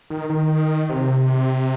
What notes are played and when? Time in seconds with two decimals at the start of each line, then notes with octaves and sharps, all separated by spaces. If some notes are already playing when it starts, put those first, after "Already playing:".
0.10 D#3
0.30 D#3
0.89 C3